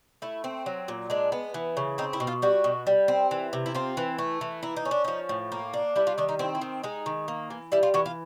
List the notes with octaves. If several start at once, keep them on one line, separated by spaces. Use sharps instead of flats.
A3 E4
C4
F#3
A#2
G#3 D4
B3
E3
C#3
C4 D#4
E4
B2
F4
G3 F#4
B2
G3
C4
E3
C3
E4
C4 F4
E3
A3
E3
A#3 E4
D#4
C#4
D4
F3 D#4
A2
A#3
D4
G3 E4
F4
D#3 D4
D#4
C4 E4
E4
D#3
G#3 D#4
D#3
A#3
E3
G3 E4
F4
E3 F#4
F4